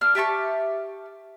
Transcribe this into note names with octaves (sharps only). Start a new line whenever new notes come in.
A#3 D4 F6
G4 E5 A5 C#6